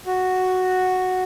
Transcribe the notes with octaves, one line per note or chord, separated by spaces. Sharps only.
F#4